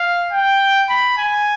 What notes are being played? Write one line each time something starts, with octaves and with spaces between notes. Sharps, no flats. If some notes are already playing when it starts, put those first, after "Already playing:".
Already playing: F5
G5
B5
G#5